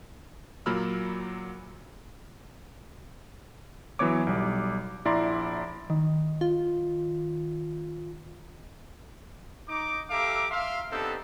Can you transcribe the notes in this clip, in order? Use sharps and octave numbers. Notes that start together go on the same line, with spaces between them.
A#2 F#3 A#3 B5 E6 F6
E3 F#3 B3 C#5 D6
B1 G3
A#1 E4 D5 A#5 C6
D#3
F4
D#4 D6
G4 A4 E5 F5 A#5 D6
E5 F5 C6
B3 C4 D4 D#4 G4 A4